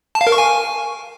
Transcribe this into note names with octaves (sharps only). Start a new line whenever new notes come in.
A5
F5
A#4
C#6
G#5